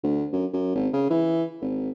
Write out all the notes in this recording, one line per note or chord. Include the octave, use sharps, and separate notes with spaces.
D2
F#2
F#2
G#1
C#3
E3
G#1